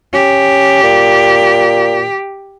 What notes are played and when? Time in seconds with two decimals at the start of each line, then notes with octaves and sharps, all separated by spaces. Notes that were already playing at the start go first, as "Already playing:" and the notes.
0.14 C#4 G4
0.83 A#2